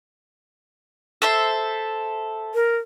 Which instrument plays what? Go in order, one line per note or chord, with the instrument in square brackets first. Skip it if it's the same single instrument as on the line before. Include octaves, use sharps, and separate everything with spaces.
[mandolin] A4 C5 E5
[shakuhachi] A#4